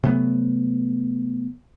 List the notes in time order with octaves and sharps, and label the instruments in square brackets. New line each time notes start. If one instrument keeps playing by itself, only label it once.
[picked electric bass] C3 F#3 A3 B3